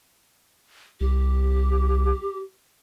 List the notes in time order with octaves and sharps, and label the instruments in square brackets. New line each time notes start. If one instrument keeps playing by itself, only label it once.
[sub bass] C2 [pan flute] G4